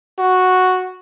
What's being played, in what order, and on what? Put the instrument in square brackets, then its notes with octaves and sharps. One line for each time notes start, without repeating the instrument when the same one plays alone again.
[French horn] F#4